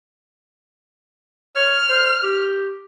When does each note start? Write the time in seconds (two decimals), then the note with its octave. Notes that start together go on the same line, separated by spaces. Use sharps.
1.56 C#5 F6
1.89 C5
2.23 G4